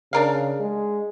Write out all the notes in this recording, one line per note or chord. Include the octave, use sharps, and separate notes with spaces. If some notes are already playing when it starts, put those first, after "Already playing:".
C#3 D4 A#4 F5
G#3